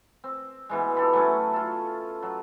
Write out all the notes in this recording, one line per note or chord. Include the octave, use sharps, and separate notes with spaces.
C4
B2 E3 G#3
G4 A4 B5
F#3 A3 C#4
F4 A4
F#3